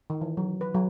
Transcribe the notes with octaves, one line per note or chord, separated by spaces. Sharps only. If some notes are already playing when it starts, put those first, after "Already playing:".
D#3
E3
F#3
B4
F#3